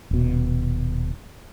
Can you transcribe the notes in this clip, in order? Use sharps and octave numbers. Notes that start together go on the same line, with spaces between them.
D#1 B2